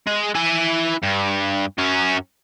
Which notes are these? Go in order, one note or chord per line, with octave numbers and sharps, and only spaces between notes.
G#3
E4 G#5
G2
F#2 C#4